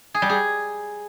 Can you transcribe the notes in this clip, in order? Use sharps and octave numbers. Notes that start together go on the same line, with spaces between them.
G#4
G3
G#4